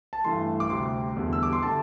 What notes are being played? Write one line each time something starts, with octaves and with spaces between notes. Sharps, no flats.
A5
G2 E3 A3 C6
D6
D2 C3 G3 C6
E2 D3 G3
E6
D6
C6
D3 A3 A5